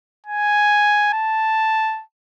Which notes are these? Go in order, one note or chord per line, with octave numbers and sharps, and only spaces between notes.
G#5
A5